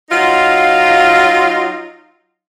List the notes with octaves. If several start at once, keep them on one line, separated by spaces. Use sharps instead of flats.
F#3 D#4 F4